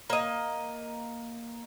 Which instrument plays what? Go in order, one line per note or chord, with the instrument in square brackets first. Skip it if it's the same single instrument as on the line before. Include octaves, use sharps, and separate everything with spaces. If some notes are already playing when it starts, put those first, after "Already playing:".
[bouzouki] A#3 D#5